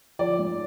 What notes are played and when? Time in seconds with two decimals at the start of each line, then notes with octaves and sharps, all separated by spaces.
0.19 F3 D5
0.39 G#2